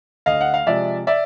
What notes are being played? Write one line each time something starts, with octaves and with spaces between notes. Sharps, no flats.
D2 D#5 F5
F#5
F5
C3 F3 G#3 D5 E5
D5 E5